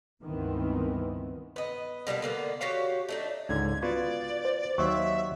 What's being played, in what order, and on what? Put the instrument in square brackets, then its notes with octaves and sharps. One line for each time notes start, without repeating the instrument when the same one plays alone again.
[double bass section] C#2 G2 D#3 E3 B3 C4
[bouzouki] B3 D#5
B2 G3 A#3 D4
D3 A#3 B3
F#4 G4 C#5 F5
A3 D4 D#4
[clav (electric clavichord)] C#2 G#2 D3 [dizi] G#6
[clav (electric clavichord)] B3 F4 F#4 [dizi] D5
[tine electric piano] C5
[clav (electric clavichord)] D#2 F#3 C5 [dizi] E5 [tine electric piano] C#6